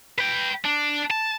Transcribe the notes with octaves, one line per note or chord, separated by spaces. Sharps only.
B4 G5
D4
A5